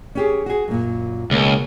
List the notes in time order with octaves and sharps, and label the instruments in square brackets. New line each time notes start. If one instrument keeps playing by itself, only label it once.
[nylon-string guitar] C#4 G4 G#4
F#4 G#4
F#2 A#2
[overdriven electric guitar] C#2 [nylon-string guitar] B2 A#3